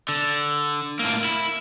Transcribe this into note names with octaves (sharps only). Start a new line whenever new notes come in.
D3
A2 A#3
E4